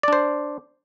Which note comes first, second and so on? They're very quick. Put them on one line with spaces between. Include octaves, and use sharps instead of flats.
D5 D4 C5